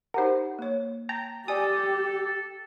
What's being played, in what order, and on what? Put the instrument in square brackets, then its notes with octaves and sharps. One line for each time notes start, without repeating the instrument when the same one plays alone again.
[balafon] D#4 G4 F#5 [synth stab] A#4 C5
[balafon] A#3 C#5
[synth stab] G5 A5 A#5
[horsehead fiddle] G4 [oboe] A4 [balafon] D5 G#5 [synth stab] D#6